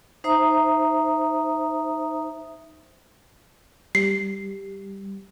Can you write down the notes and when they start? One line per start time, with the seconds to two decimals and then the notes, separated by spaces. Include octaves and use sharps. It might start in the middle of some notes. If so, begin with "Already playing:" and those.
0.24 D#4 C5 E5 A#5 D#6
3.95 G3 C7